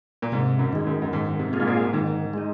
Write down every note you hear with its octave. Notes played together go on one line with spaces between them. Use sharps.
A#2
G#2 C3
F#2
D#3 G#3
F#2
F#2
G#2 D#3
C3
A#3 F4 G#4
G#2
A#2
G#2 D#3
G#3 D#4